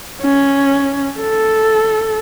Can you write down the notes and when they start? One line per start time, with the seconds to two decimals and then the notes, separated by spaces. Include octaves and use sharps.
0.22 C#4
1.20 A4